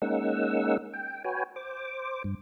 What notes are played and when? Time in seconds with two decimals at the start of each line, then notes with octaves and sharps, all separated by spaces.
0.02 G#3 A#3 C#4 D#4 F#5 E6
0.94 G5
1.24 F#4 B4 C#5 G5 G#5
1.56 C5 D6
2.24 G2